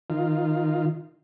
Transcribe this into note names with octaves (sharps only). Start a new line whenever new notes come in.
D#3 F4